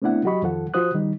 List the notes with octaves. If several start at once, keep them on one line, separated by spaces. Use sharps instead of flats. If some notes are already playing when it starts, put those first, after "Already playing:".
A3 B3 C4 D4 E4 F#5
F#3 F#4 G4 D#5 B5 C#6
F2 D#3 F3 A4 F#5
F3 F4 F#4 C5 D#6 F#6
D#3 G3 D#4